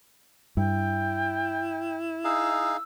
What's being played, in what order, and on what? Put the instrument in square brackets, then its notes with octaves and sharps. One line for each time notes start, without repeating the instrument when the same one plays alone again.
[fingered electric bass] G2 [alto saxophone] E4 [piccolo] G5
[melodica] D#4 G#4 F5 [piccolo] E6